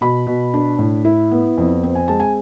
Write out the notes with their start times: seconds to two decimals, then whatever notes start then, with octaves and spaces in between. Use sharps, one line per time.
0.01 B2 B5
0.27 B2
0.54 D4
0.79 A2
1.05 E4
1.32 B3
1.58 F2
1.83 C4
1.95 G#5
2.08 G#3 A5
2.20 G#5